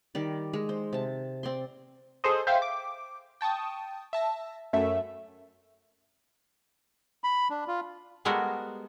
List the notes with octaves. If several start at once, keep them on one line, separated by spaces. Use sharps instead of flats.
D#3 G3 D5
G#3
C5
C3 A5
C4 D5 C6
G#4 A4 C5 D#5
C5 E5 F5 G5 C6
D6
G5 A5 C#6 D#6
E5 A5 A#6
F#2 A3 E5
B5
D4
F4
G3 G#3 B3 F#4 A4 A#4